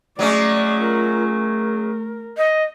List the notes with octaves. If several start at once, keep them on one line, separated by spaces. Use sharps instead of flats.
F#3 G#3 A3 C#4 D5
F4 A#4
A#4
D#5